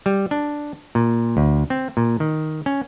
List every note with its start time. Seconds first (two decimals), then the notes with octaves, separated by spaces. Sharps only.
0.06 G3
0.31 D4
0.95 A#2
1.37 D2
1.70 C4
1.97 A#2
2.20 D#3
2.66 C#4